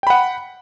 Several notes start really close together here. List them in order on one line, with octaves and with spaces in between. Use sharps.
G5 B5 F#5